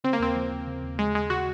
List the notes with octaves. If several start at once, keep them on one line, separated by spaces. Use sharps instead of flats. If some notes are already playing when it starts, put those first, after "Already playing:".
C#3 C4
A#3
D#2 C4
F3
D#2
C#3
D#2
F3 G#3
D#2 G#3
C#3 F#4